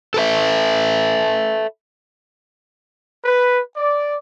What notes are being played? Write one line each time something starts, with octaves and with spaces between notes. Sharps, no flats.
A4 B4 E5
B4
D5